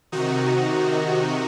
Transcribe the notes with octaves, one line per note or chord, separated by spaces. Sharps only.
C3 D#3 D#4 F#4